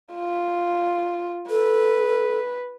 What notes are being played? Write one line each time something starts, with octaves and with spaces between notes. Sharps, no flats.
F4
A4 B4